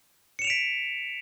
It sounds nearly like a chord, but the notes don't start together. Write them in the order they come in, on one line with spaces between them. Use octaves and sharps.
C#7 E7 F7 D7 B6